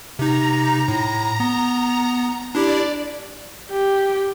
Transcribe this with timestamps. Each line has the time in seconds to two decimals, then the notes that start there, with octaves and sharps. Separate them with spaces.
0.19 C3 D#4 A#5
0.88 A2
1.40 B3
2.55 D4 E4 G4 D5
3.71 G4